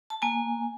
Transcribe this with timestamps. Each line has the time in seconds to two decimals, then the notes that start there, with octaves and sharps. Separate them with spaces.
0.10 A5
0.22 A#3 G#5